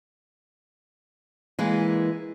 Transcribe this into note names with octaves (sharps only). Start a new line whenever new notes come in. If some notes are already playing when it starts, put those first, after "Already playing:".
E3 G#3 A#3